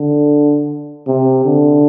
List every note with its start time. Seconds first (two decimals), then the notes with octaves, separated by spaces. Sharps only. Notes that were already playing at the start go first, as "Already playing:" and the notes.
Already playing: D3
1.07 C3
1.45 D3